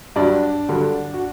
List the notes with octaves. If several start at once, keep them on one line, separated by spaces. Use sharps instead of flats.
G2 F#3 D4
G2 D3 F#3
F#4